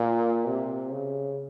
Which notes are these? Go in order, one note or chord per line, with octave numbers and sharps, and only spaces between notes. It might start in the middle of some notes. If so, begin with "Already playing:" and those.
Already playing: A#2
C3
C#3